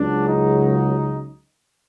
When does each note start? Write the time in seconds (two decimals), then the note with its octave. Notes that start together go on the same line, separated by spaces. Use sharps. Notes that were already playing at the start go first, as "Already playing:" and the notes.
Already playing: C#2 C#3 F#3 D4
0.28 D#4